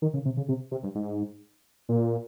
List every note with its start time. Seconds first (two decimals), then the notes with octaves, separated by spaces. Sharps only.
0.02 D#3
0.14 C#3
0.25 C3
0.37 C#3
0.48 C3
0.72 C3
0.83 G2
0.95 G#2
1.89 A#2